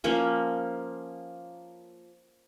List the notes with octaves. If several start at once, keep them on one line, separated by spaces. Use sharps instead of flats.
F3 A#3 C#4